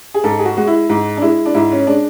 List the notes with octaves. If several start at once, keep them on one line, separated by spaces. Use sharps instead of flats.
G#4
G#2 A4
G#4
F#4
G#3 F#4
E4
G#2
D4
G#3 E4
D4
G#2 E4
C#4
G#3 D4